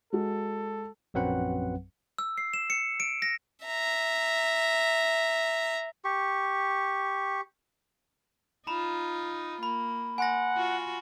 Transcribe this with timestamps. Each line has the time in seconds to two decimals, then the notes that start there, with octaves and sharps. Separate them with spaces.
0.13 G#3 F#4 A4
1.14 A#1 F#2 F#3 C4 B4 F#5
2.18 E6
2.38 C7
2.54 E7
2.70 C#7
3.00 D7
3.22 A#6
3.65 E5 A#5
6.05 G4 C#6
8.67 D#4 F4 A#5 B5
9.63 A#3 B5
10.18 F#5 G#5 C6 A#6
10.56 F4 F#4